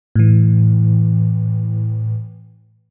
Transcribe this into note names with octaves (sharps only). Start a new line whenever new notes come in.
A2 E3